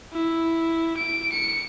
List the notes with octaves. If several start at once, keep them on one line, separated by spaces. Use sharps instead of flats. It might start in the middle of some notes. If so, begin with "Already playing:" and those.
E4
D7
C#7